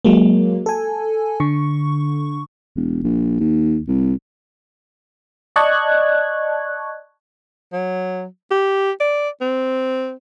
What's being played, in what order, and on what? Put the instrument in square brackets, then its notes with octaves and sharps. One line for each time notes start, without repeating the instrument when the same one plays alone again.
[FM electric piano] F#3 G#3 A#3
A4 G#5
D3 C#6
[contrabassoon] E1
A#1
D#2
C2
[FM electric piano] D5 D#5 A5 C#6 F#6 G#6
[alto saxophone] F#3
G4
D5
C4